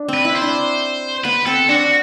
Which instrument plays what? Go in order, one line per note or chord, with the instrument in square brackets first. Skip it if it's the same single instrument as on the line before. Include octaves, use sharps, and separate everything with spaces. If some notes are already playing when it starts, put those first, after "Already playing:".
Already playing: [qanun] D4
C4
[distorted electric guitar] B4
[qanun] E4
[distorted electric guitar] C5
[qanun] D4
[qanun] B3 [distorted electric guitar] B4
[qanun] C4 [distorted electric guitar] A4
[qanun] D4 [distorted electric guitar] F#4